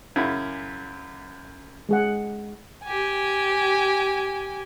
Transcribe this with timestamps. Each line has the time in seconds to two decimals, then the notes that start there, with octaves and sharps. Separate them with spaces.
0.16 F#2 C#3 E4
1.89 G#3 G#4 F#5
2.84 G4 G#5